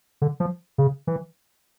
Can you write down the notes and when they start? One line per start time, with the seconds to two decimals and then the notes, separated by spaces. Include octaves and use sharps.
0.22 D3
0.40 F3
0.78 C#3
1.07 E3